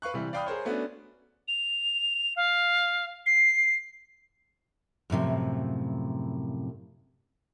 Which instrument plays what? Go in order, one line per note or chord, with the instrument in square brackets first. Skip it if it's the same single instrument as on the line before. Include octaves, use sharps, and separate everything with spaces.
[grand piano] B4 F5 C#6 F#6
C3 E3 G3
D5 F5 G5 B5 D#6 F6
G#4 A#4 C5 C#5
A3 B3 C#4 D4 F#4
[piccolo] F7
F5
C7
[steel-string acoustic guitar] F#2 A2 C3 F3